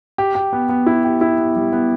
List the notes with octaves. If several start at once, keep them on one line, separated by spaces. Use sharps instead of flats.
G4
G4
B3
B3
E4
G4
E4
B3
G3
B3